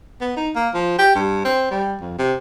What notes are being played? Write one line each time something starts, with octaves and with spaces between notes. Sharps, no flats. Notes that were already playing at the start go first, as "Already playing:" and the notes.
B3
D#4
A#3
F3
G4
G2
C4
G3
F2
C3